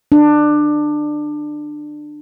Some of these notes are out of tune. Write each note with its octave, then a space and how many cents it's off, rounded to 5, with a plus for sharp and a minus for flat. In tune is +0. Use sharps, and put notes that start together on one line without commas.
D4 +20